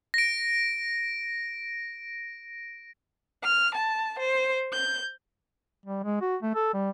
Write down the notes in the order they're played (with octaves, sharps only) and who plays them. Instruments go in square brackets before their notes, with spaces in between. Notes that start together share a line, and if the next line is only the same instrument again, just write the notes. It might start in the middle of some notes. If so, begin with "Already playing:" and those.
[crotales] A#6 D7
[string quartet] F6
A5
C5
G6
[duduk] G3
G#3
F#4
A3
A4
G3